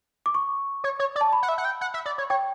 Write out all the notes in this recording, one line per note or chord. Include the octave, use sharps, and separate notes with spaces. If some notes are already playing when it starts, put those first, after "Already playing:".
D6
C#6
C#5
C#5
D5
A5
B5
F#5
E5
F#5
G5
F#5
E5
D5
C#5
C#5 G5